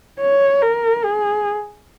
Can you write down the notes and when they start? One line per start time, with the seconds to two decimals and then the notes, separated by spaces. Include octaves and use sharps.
0.20 C#5
0.62 A#4
1.04 G#4